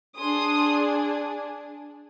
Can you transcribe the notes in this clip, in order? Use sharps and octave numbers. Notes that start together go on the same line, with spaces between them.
D4 G#4 C6 D#6